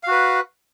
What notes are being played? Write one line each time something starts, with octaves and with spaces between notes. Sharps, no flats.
F#4 B4 F5